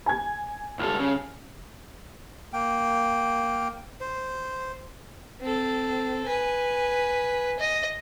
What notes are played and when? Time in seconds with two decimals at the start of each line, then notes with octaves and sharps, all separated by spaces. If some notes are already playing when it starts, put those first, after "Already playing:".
0.06 G#5 G#6
0.79 C#2 G3 A4 F6
0.99 C#3
2.53 A#3 G5
4.01 C5
5.41 C4 A4
6.26 B4 G#5
7.60 D#5